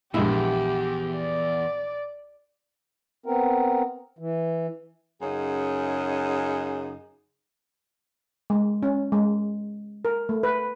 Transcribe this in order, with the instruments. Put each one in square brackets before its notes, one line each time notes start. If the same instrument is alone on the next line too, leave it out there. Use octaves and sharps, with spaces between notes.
[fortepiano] A#1 G#3 E5 [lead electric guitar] E2 [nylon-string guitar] E4 [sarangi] G4
[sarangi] D5
[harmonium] B3 C4 A#4
E3
[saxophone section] F#2 C#3 D#4 G#4
[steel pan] G#3
C#4
G#3
A#4
A3
B4